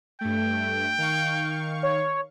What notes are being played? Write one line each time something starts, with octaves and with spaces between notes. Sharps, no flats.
G2 A3 G5
D#3 F5 C#6
C#5